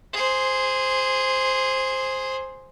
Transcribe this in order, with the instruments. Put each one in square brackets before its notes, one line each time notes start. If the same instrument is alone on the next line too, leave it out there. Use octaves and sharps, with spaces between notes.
[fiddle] G#4 C5